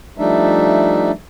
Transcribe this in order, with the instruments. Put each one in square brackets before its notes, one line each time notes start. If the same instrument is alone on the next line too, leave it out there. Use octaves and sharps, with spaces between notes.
[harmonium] F3 G3 A3 D4 D#4 E5